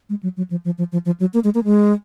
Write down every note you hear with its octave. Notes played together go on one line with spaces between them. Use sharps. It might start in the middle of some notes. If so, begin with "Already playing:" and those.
G#3
F#3
F#3
F3
F3
F3
F3
F3
F#3
A#3
G#3
A#3
G#3